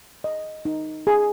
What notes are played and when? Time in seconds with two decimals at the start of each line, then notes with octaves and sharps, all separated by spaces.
0.24 D#5
0.65 D#4
1.07 G#4